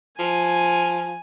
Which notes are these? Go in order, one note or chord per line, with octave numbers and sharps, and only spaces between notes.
F3 G#5